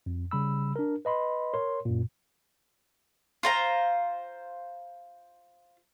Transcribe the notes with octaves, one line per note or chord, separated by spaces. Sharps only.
F2
C#3 G3 B5 E6
D4 A#4
B4 D#5 B5 C6
A#4 C#5 C6
F#2 A#2
F4 C5 A#5